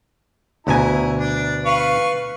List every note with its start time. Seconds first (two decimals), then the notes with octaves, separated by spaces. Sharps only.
0.67 D2 B2 E4 G#5 A#5
1.19 D4 D5
1.66 B4 F5 C#6